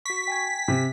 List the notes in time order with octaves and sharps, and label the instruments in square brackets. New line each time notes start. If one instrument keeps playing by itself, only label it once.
[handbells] F#4 C#6 [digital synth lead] B6
[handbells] G5 G#5 G#6
[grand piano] C3